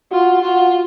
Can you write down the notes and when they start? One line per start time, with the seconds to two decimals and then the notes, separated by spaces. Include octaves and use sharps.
0.11 F4 F#4
0.42 F4 F#4